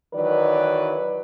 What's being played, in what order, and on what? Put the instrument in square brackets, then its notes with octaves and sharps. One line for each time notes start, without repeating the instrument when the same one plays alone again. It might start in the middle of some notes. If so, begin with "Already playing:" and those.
[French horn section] D#3 E3 F#3 B4 D5